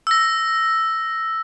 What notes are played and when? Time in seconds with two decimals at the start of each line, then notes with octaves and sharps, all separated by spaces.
0.07 E6 A#6